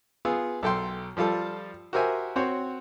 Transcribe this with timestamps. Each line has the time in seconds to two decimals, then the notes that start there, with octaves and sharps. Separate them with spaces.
0.25 B3 F4 G#4 E6
0.63 B1 A4 G5 C6
1.17 F3 G3 F4 A4 A5
1.93 F#4 G4 A#4 C5 E5 G#5
2.36 C4 F#4 C5 C#5